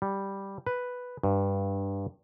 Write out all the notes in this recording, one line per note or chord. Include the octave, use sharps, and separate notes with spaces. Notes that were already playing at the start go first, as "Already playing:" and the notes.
G3
B4
G2